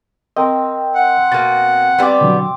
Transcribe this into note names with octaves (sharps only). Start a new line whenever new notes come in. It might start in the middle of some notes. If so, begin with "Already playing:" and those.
C4 A#4 D#5
F#5
B2 A#3 A6
G3 B3 C4 D6
B2 D3 F#3